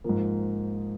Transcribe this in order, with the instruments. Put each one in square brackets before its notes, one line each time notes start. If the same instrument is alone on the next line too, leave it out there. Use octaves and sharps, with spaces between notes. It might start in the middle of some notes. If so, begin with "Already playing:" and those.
[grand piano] G#2 F3 A#3